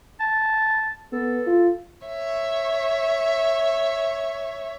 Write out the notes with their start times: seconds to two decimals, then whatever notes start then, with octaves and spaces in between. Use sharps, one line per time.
0.20 A5
1.13 B3 A4
1.47 F4
2.06 C#5 E5